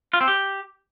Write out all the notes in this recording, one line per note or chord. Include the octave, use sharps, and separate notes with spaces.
F4
C4
G4